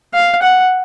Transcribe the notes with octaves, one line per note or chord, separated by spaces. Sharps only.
F5
F#5